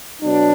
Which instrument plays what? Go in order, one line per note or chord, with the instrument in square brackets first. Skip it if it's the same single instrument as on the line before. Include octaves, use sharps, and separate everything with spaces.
[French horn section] B2 F#3 D4